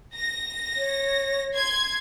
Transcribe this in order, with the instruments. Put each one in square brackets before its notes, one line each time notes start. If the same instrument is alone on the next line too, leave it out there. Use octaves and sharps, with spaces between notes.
[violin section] A#6
[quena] C#5
[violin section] C6 G#6